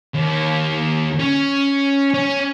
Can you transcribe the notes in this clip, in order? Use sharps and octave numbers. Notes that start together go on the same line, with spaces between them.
D#2
C#4
C#4